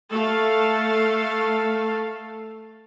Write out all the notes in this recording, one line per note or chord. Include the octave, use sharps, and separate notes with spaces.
A3 A4 F5